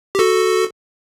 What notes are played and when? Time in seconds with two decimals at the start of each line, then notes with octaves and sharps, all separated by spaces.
0.15 G4
0.19 F#4 A4